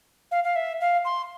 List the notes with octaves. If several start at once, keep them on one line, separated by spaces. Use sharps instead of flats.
F5
F5
E5
F5
C6